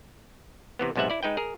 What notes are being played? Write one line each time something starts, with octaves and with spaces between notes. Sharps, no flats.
C3 E3 B3
B1 G#2 C3 B3 E5 F#5
E4 D5
G#3 D#4 B4 G5
G#4 A#4